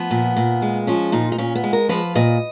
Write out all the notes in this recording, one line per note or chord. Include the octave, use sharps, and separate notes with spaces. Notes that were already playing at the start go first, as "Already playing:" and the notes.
Already playing: F3 B3
A#2
A#2
G#3
F3 C#4
A#2 D#4
D#4
A#2 C#4
B3
G#3
A#4
F3 B4
A#2 D#5